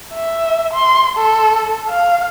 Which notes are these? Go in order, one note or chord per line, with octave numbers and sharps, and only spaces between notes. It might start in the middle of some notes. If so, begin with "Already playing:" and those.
E5
C6
A4
F5